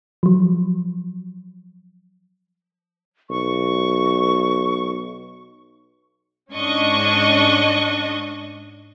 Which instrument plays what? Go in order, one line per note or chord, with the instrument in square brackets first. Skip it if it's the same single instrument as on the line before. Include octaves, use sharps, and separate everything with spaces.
[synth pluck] F3 F#3
[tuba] B1 [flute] C#6
[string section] G#2 C#4 D4 D#5 C#6